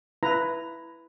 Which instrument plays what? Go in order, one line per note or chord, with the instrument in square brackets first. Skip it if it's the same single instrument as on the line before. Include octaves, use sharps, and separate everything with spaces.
[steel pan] E4 B4 A#5